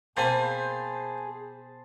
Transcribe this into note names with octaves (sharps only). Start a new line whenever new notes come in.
B2 A#3 C4 G#4 C5 G#5 A5 B5